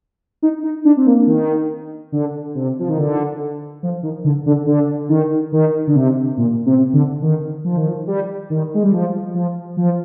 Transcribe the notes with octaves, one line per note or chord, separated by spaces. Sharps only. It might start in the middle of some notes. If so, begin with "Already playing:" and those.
D#4
D#4
D4
C4
A#3
D#3
D3
C3
F3
D#3
D3
F3
D#3
D3
D3
D3
D#3
D#3
D3
C3
A#2
C3
D3
D#3
F3
D#3
F3
G3
D#3
G#3
G3
F3
F3
F3